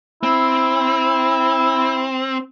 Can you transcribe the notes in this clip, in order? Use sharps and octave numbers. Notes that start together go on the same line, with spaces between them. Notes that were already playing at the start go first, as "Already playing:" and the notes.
C4 E4